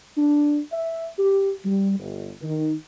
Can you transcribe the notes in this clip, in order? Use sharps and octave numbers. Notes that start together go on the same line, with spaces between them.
D4
E5
G4
G3
G1
D#3